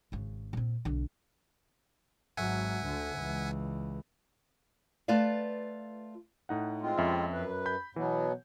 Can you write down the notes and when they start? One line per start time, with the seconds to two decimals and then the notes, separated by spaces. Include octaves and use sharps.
0.12 G#1 C#3
0.53 A#2 C4
0.85 B1 D3
2.37 G#1 F#3 E5 F#5 G#5
2.85 D2 D3
3.16 C#2 E3
5.08 A3 F4 B4 D5 F5
6.49 A2 D#4 F#5
6.81 G#3 C4 F4
6.98 F2 C#4 E5
7.33 F#2 B4
7.66 B5 G6
7.96 B2 E3 F#3 B3